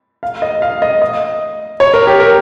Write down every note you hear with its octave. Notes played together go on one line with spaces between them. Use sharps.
F5
D#5
F5
D#5
D#5
C#5
A#4
G4
A#4